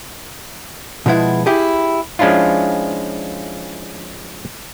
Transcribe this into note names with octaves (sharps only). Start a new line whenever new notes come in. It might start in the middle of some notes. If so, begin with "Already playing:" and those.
B2 F3 G#3 B3 E4
E4 G4 G#4
F3 G#3 C#4 D4 E4 F4